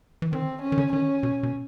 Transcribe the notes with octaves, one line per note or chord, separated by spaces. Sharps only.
E3
D#3 C4
C#4
D#3
D3
D#3 C#4
B2
B2